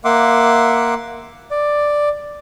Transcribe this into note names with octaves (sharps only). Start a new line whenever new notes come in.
A#3 E5 F#5 C6 D6
D5